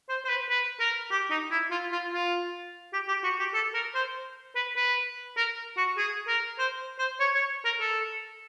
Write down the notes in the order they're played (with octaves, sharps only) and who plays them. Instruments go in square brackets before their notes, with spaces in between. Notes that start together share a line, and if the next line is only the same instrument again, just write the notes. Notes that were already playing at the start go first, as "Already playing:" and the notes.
[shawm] C5
C5
B4
B4
A#4
G4
D#4
E4
F4
F4
F4
G4
G4
F#4
G4
A4
A#4
C5
B4
B4
A#4
F#4
G#4
A#4
C5
C5
C#5
C#5
A#4
A4